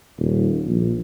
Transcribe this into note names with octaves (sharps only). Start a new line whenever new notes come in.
D#1
A#1